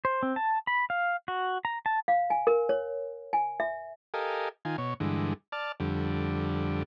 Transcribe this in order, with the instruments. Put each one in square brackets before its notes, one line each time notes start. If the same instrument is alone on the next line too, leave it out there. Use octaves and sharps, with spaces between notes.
[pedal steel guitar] C5
C4
A5
B5
F5
F#4
A#5
A5
[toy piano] F5
G#5
A#4
C#5
G#5
E5
[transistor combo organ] G4 A4 A#4 D#5 F5 G#5
D#3 F4 G#5
B2 C#5
G2 D3 E3 G#3
D5 A5 F6
F2 D3 G3